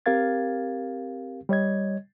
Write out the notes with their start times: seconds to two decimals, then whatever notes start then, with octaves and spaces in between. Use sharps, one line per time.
0.06 C4 G4 A#4 F5 G#6 A6
1.49 G3 C#5 D#5 G#6